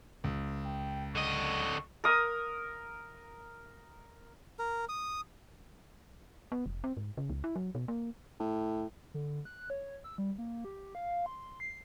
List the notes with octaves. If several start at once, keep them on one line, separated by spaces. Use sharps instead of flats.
C#2
G5
D3 D#5 C#6
A#4 D#6
A#4
D#6
B3
F1
C4
G#2
C#3
C#2
E4
F#3
B2
A#3
A2
D3
F#6
C#5
E6
G3
A#3
G4
F5
C6
C7